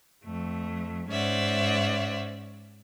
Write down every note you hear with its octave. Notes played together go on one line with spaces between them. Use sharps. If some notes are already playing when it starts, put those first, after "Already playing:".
F2 A3
G#2 C#4 C5 D5 E5 F#5